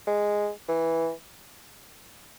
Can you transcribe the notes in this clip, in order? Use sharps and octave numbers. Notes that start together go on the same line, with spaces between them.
G#3
E3